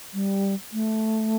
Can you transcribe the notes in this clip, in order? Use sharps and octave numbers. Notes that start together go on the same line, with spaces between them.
G3
A3